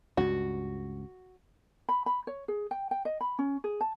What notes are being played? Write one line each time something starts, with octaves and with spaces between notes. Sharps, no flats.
C#2 G2 F#4
B5
B5
C#5
G#4
G5
G5
D#5
B5
C#4
G#4
A5